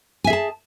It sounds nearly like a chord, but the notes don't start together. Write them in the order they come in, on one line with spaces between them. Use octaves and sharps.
G#5 E5 G#4 A5